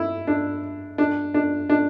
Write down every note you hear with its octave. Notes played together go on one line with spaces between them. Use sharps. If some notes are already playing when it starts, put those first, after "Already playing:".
Already playing: E4
D4
D4
D4
D4